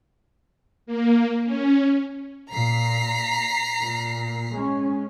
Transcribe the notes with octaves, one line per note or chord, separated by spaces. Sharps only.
A#3
C#4
A#2 A#5 B6 C7
A#2
G#3 C#4